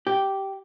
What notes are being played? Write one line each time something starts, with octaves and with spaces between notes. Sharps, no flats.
G4